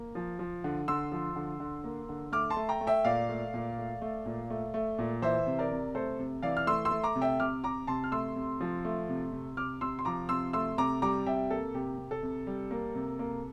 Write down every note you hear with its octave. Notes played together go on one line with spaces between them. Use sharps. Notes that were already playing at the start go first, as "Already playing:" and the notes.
Already playing: A#3
F3
F3
D3
D3 C6 E6
F3
D3
D3
A#3
D3
A3 D6 F6
A5 C6
A3
G5 A#5
A3
E5 G5
A#2 D5 F5
A3
A#2
A3
A3
A#2
A3
A3
A#2
E3 C5 E5
C3
A#4 D5
C3
A3 A4 C5
C3
E3 D5 F5
F6
A3 C6 E6
C6 E6
A3
A#5 D6
C3
E5 G5
C3 D6 F6
C3 A#5 D6
C3 A5 C6
F6
A3 C6 E6
C3
F3
A3
C3
C3
C3 D6 F6
C3 C6 E6
C6
F3 A#5 D6
C3 C6 E6
A3 C6 E6
C3 A#5 D6
G3 A#5 D6
C3 E5 G5
A#3 A4
C3 G4
C3
A4
C3
G3
A#3
C3
A#3